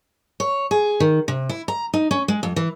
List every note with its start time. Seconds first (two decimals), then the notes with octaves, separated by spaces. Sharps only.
0.40 C#5
0.71 G#4
1.00 D#3
1.28 C3
1.49 E4
1.68 A#5
1.94 D#4
2.11 C#4
2.28 G#3
2.43 F2
2.56 E3